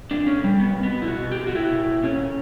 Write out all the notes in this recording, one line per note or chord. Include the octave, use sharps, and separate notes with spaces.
A#2 D4
A#2 C#4
A#2 G3
A#2 B3
A#2
B3
A#2
E4
B2 F#4
B2
G4
B2
F#4
A#2 E4
A#2
A#2
A#2 C#4
A#2